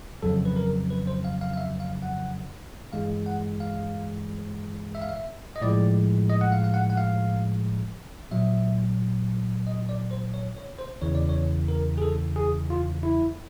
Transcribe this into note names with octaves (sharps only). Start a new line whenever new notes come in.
F2 C#3 F#3 A4
B4
A#4
B4
C5
F5
F5
F5
E5
F5
F#5
G2 E3 G#3 F5
F#5
F5
E5
F5
E5
D#5
A2 F3 G#3 D5
D#5
F#5
F5
F5
F#5
F#5
F5
A#2 F#3 E5
D#5
D5
C5
C#5
C#5
C5
E2 C#3 E3 C#5
D5
C#5
A#4
G#4
A4
G#4
F4
E4